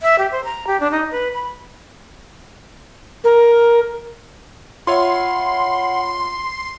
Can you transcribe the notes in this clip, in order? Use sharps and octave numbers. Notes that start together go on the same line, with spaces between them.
E5
G4
C5
A#5
G4
D4
D#4
B4
B5
A#4
F4 C#5 E5 F#5 B5 C6